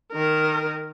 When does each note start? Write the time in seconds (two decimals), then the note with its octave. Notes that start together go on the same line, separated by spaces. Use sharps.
0.13 D#3 A#4